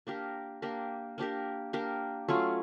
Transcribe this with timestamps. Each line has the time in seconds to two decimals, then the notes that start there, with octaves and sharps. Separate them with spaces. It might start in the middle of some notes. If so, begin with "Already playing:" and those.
0.07 A#3 D4 G4 A#4
0.62 A#3 D4 G4 A#4
1.18 A#3 D4 G4 A#4
1.73 A#3 D4 G4 A#4
2.28 F#3 A3 C#4 F4